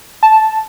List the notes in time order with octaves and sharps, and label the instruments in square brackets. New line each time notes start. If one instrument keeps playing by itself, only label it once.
[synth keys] A5